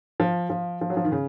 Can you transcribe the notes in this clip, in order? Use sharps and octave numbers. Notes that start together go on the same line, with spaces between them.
F3
F3
F3
F#3
F3
D#3
C#3